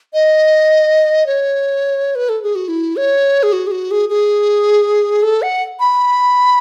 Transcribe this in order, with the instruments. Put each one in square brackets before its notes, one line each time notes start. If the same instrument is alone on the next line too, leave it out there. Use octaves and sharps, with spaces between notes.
[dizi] D#5
C#5
B4
A4
G#4
F#4
E4
C#5
G#4
F#4
G#4
F#4
G#4
G#4
A4
F#5
B5